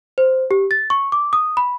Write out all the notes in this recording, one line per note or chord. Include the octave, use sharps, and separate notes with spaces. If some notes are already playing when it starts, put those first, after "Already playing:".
C5
G4
A6
C#6
D6
D#6
B5